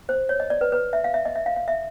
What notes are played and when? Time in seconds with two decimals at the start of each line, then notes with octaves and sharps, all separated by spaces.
0.09 C5
0.29 C#5
0.40 D#5
0.50 D5
0.61 B4
0.72 B4
0.93 E5
1.04 F5
1.14 E5
1.25 D#5
1.36 E5
1.46 F5
1.56 F5
1.68 E5